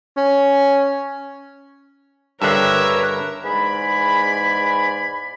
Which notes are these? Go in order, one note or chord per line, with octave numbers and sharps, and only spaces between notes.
C#4
G2 D3 A#4 B4 C#5 E5 A#5
E2 G#2 G#3 D5 G#5 B5